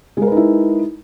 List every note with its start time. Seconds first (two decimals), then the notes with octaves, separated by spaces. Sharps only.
0.17 G#3
0.22 A#4
0.27 B4
0.32 D#4
0.37 E4